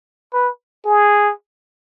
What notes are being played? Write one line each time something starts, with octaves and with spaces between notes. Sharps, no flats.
B4
G#4